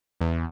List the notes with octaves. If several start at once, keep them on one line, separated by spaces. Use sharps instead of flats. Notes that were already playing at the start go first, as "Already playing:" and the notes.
E2